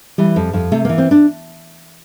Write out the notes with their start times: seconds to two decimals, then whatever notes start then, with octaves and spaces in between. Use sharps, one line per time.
0.18 E3 G3
0.36 F2
0.53 F2
0.71 C3 A3
0.85 E3 A#3
0.98 C4
1.11 D4